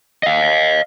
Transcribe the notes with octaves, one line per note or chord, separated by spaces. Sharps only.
D#5 F5